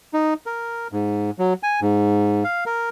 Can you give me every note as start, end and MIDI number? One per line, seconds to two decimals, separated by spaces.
0.14 0.34 63
0.46 0.88 70
0.92 1.30 44
1.39 1.53 54
1.63 1.80 80
1.82 2.43 44
2.44 2.64 77
2.66 2.89 70